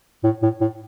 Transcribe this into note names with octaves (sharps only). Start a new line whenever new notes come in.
A2
A2
A2